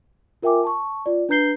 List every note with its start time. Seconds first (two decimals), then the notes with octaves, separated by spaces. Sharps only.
0.42 F4 A#4 E5 G5 G#5 D6
0.64 A5 C#6
1.06 F4 D5
1.29 D4 B4 A#5 G6 C7 G7